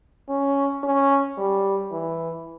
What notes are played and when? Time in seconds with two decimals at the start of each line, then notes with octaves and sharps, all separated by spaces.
0.29 C#4
0.83 C#4
1.38 G3
1.92 E3